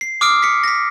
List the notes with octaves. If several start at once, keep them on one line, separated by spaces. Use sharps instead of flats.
C7
D6 D#6 F6 C7 D7
B6 C#7
A#6 B6